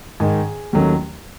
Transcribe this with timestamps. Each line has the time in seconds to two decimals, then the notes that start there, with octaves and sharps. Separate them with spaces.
0.20 G#2 D#3 G#3 G#4
0.73 D#2 D#3 F#3 A3 C#4